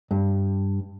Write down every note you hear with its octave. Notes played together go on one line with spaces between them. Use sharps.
G2